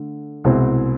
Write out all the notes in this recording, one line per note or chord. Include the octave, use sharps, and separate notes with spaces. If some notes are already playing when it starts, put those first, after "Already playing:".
Already playing: D3 A3
C2 B2 G#3 C4 E4